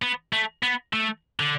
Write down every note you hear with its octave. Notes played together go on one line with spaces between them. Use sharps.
B3
A3
B3
A3
D3